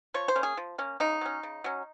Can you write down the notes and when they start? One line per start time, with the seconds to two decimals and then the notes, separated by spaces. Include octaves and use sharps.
0.14 F3 C#5
0.28 C5
0.35 A#3 C#4
0.43 G#4
0.57 F3
0.78 A#3 C#4
1.00 C#3 D#4
1.21 F#3 C#4
1.43 C#3
1.64 F#3 C#4